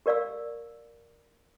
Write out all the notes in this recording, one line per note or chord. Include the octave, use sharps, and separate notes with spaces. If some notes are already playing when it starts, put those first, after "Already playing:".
G4 A#4 D5 F5 E6